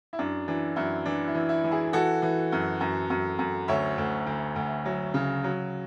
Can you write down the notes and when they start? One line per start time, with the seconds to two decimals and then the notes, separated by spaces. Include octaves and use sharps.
0.13 E4
0.19 F#2 D4
0.48 E3 D4
0.76 F#2 E4
1.05 E3 D4
1.27 E4
1.35 E3
1.49 E4
1.64 E3
1.71 E4 G#4
1.93 E3 F#4 A4
2.22 E3
2.52 F#2
2.81 F#2
3.10 F#2
3.39 F#2
3.68 D2 C#5 E5
3.98 D2
4.27 D2
4.56 D2
4.85 F#3
5.14 C#3
5.44 F#3